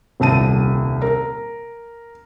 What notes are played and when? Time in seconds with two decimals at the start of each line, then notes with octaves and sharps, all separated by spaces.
0.20 D#1 C2 A5 D#7
1.02 A#4